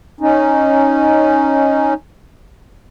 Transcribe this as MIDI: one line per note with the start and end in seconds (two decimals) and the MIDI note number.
0.21 1.94 61
0.21 1.94 63